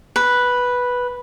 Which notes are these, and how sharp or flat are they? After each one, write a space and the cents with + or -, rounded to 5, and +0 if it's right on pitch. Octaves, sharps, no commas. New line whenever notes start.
B4 -5